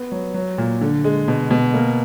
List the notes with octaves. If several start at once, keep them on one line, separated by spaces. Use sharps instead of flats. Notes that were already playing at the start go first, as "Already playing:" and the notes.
Already playing: B3
F#3
F#3
A#2
D3
G#3
B2
B2
A#3